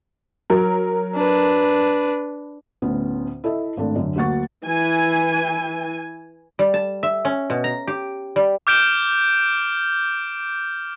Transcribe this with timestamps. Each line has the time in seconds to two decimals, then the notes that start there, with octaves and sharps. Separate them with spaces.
0.50 F#3 A#4
1.15 D4 B4
2.82 D2 A2 B3 C#4
3.44 E4 A4 D#5 E5
3.77 G#1 A2 D4 A4
3.96 F#2 D3
4.15 D2 F#3 A#3 F#5 C#6 A6
4.65 E3 G#5
6.59 G3
6.74 A5
7.03 E5
7.25 C#4
7.50 B2
7.64 A#5
7.87 G4
8.36 G3
8.67 D6 F6 G6 D7 E7 G7